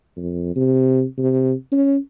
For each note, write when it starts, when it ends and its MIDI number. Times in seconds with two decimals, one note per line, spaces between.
0.17 0.55 41
0.56 1.04 48
1.18 1.53 48
1.72 1.97 61